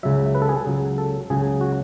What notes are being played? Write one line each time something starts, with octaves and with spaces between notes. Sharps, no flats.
C#2 C#3 F#3 E5
B4
A4
G#4
A4
C#2 C#3 F#3
A4
C#2 C#3 F#3 G#4
F#4